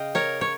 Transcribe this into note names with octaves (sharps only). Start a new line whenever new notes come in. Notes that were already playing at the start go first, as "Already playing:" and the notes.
Already playing: C#3 D#5 F5 G5
A#4 C#5
C#5